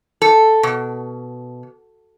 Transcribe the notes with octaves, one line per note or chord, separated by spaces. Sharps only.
A4
B2